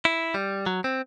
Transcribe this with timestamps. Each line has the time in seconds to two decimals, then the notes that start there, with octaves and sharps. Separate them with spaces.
0.05 E4
0.34 G3
0.66 F#3
0.84 C4